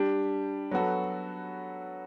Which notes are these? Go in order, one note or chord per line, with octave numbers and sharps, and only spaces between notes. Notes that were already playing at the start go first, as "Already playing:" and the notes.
Already playing: G3 D4 G4
F#3 B3 F#4 A4